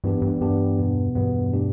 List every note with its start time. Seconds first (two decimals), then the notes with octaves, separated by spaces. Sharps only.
0.04 G2 E3 B3 D4 G4
0.22 G2
0.41 G2 E3 B3 D4 G4
0.78 E2 B2 B3
1.15 E2 G2 B2 B3
1.53 B2 A3 D4 G4